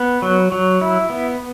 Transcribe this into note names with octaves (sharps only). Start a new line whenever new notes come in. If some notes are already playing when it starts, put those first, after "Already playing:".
Already playing: B3
F#3
F#3
E4
B3